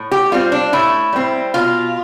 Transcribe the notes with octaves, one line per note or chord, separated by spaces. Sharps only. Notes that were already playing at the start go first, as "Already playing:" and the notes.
Already playing: A2
G4
G3 C4 F4
D4
A2 E4
G3 C4
B2 F4